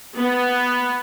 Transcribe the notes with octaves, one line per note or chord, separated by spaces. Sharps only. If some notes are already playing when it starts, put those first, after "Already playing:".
B3